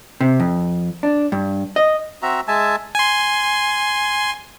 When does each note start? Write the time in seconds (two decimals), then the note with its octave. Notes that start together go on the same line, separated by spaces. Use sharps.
0.21 C3
0.40 F2
1.03 D4
1.32 G2
1.76 D#5
2.22 C4 F#4 E5 A#5
2.48 G#3 E5 G#5 A5
2.95 G#5 C6